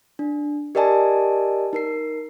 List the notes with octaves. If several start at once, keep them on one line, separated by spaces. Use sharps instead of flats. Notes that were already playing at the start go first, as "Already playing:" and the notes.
D4
G4 A#4 D5 D#5 G#5 A5
D#4 A#4 C7